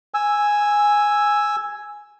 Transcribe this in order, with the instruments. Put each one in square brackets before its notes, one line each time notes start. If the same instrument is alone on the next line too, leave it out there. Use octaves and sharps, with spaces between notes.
[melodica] G#5 E6